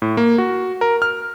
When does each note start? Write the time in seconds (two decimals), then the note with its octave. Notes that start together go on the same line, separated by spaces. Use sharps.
0.02 A2
0.17 A#3
0.38 F#4
0.81 A#4
1.02 F6